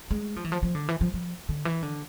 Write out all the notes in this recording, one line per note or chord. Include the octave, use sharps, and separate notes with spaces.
G#3
F3
E3
F3
F3
D3
E3
F3
F3
D3
E3
D3